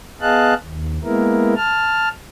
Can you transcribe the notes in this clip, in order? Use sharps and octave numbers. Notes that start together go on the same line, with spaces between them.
B3 G#4 D#5 F5 A5 F#6
D#2
G#3 A#3 B3 E4 A#4
A5 F6